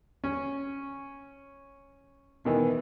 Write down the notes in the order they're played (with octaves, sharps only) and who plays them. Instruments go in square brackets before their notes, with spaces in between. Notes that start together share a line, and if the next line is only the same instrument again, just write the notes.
[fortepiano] C#4
B2 D#3 E3